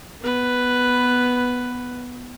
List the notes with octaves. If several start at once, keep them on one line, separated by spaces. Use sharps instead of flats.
B3 B4